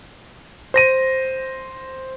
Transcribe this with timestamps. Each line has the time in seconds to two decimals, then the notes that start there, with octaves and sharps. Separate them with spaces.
0.74 C5 A#6 D#7